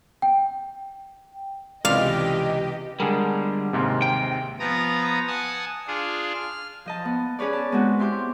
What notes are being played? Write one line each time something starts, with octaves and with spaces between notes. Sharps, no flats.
G5
C#2 C3 E3 G4 D5 D#5 F5
D3 G3 G#3 G#4 A#4
D#2 G#2 C3
G5
F3 B3 A#5 D#6
F#5 G#5 A5 D#6
D4 F4 G#4
F6
F3 D#5 A5
B3
C#4 G#4 B4 C#5 D5
A5
G#3 B3 C4 F#4
E4 G4 C6 D6